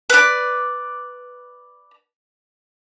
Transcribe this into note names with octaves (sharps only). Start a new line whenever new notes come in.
B4 D5